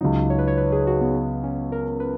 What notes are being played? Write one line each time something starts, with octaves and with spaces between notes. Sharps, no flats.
C#2 C#3 F#3 D#4
C#5
B4
C#5
B4
G#4
F#4
B3
B3
C#4
A#4
B4